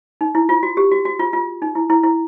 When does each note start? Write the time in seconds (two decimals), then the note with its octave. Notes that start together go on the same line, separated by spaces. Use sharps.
0.21 D#4
0.35 E4
0.49 F4
0.63 F#4
0.77 G4
0.91 F#4
1.05 F#4
1.19 F4
1.33 F4
1.62 D#4
1.75 E4
1.90 E4
2.03 E4